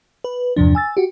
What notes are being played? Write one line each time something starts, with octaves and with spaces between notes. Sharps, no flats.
B4
E2 G2 C3 F3 D4
G#5 E6 A6
F#4 G4